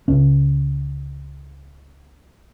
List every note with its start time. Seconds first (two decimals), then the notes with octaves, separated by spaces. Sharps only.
0.08 C#2 C#3 C#4